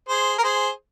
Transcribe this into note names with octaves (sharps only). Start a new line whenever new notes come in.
G#4 C5
A#4
G#4 C5